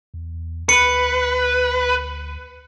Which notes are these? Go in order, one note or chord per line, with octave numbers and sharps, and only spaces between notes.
E2
D2 B4 C#7